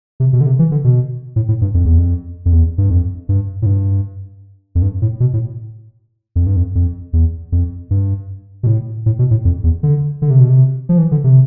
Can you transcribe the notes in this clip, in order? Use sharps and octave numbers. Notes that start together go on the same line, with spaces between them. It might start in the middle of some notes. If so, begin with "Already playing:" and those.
C3
B2
D3
C3
E3
D3
B2
A2
A2
G2
F2
E2
F2
F2
E2
G2
F2
G2
A2
G2
F2
G2
A2
B2
A2
F2
G2
F2
F2
E2
F2
G2
B2
A2
A2
B2
A2
F2
E2
D3
D3
C3
B2
C3
F3
E3
D3
C3